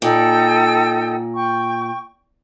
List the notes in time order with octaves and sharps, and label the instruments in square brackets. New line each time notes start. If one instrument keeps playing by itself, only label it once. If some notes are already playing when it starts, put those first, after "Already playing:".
[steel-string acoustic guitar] A#2 [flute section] D#4 A4 G5
[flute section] G5 C#6